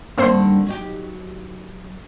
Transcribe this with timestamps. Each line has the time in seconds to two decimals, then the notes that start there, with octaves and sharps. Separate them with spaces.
0.18 G2 D3 D#3 A#3 C4 C5
0.67 F#3 D#4 G4